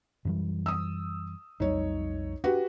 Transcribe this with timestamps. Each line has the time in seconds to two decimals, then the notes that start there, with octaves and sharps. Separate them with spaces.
0.25 F#2 E3 G3
0.66 D#6 E6
1.60 B1 F2 G3 D#4 C#5
2.44 D4 F#4 G4 B4